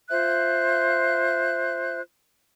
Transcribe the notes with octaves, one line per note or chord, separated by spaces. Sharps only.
F4 C5 E5 F#6